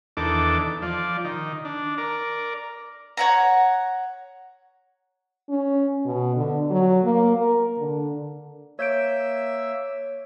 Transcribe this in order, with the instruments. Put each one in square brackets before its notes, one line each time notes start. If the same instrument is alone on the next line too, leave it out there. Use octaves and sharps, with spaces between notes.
[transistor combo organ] E2 D#3 D4 A4 D6
F3 D5
D#3
D4
A#4 D5
[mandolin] C#5 F#5 A#5
[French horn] C#4
B2
D3
F#3
A#3
A#4
D3
[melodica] A#3 E5 E6 [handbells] C#5 G6 D7